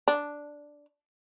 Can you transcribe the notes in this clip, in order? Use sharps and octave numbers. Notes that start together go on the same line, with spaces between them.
D4